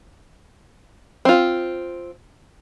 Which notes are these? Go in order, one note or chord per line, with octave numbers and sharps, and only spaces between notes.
C4 F4